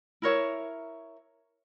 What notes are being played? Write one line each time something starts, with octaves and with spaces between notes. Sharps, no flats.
E4 A#4 C#5 E5